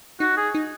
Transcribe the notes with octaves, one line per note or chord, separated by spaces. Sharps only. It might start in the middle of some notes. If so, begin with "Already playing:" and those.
D#4 F#4
G#4
D#4